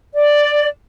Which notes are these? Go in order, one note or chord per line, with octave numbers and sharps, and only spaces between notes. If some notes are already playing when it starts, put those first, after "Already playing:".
D5